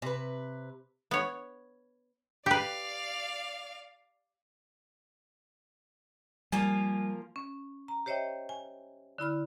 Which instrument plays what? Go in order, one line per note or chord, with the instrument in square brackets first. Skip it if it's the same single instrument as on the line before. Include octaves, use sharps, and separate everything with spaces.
[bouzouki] C3 B4
[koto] B3 C#5
[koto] G4 B4 [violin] D5 F5
[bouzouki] F3 A#3 A#4 [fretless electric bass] G3 [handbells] G#5
[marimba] C#4
A#5
G4 C5 C#5 D#5 E5 G5
G#5
D3 E4 B5 F6